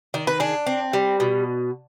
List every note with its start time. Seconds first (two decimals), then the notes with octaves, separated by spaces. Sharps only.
0.14 D#3 D5
0.27 B4
0.40 D4 G#4
0.66 C4
0.93 G3
1.20 B2